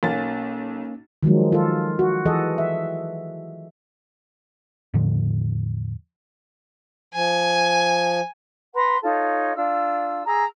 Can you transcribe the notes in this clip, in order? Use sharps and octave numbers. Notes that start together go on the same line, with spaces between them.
B1 A#3 C#4 A6
D#3 F3 F#3 G#3
F4 A4
F#4
E3 G#4 A4 D#5 F#5
E5
E2 A2 D3 F3
F3 G#5
B4 F#5 A#5 C6
D#4 F4 A4 C#5
D4 F4 E6
G#4 A#5 E6